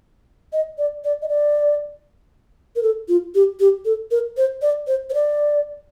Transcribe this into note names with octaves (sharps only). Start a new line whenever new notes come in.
D#5
D5
D5
D#5
D5
A#4
A4
F4
G4
G4
A4
A#4
C5
D5
C5
C5
D5